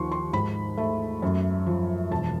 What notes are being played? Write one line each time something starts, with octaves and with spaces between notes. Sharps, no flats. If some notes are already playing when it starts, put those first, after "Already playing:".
Already playing: D#2 F3 C6 C#6
C6
G#2 B5
A3
F#2
F3
E1 A5